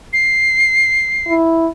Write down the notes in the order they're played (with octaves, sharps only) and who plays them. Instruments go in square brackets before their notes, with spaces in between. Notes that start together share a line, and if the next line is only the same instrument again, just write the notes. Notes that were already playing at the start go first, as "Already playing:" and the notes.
[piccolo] C7
[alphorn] E4